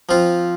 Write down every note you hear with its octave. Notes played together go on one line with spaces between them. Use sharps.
F3 C4 F4